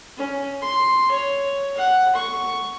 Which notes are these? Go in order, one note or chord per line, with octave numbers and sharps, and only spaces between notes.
C#4
C6
C#5
F#5
C#6